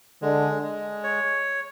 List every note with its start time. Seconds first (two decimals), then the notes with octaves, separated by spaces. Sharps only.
0.22 D3 G#3
0.63 G#3
1.04 C#5